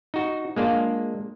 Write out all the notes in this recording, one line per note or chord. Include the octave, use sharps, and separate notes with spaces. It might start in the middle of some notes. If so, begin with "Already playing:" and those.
D#4 F#4
G#3 A#3 D4 F4